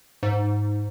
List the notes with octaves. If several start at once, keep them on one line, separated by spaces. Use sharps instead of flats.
G#2